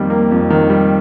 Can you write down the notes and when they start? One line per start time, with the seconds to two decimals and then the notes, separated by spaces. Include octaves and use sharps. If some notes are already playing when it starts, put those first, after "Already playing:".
Already playing: F2 D#3 G3 A#3
0.10 A#3
0.31 F2
0.50 D#3
0.69 G3